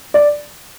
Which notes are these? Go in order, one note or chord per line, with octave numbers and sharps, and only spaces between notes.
D5